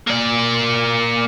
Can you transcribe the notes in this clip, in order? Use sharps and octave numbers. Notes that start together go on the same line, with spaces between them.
A#3 D5